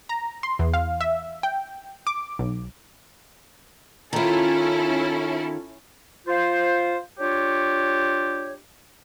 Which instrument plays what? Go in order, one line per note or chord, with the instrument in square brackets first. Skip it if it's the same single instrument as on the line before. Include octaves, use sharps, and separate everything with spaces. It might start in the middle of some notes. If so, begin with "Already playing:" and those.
[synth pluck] A#5
C6
E2
F5
E5
G5
D6
B1
[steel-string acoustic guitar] D#3 F4 [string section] C#4 E4 A4
[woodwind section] F4 C5
D4 F4 G4 C#5